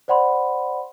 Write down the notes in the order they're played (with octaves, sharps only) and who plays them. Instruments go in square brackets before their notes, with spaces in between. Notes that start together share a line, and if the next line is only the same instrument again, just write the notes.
[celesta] C5 D5 F#5 B5 C6